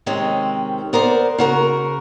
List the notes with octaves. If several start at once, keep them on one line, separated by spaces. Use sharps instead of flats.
C3 D#3 G#3 C4 C#4
B3 A#4 C5 D5
C#3 F#4 A#4